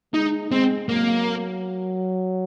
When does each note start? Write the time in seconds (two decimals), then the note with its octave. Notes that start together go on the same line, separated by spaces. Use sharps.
0.14 G#3 D#4
0.51 G#3 C4
0.89 F#3 A#3